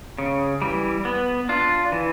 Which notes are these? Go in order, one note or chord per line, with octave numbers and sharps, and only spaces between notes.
C#3
E3 G3
B3
D4 F4
E3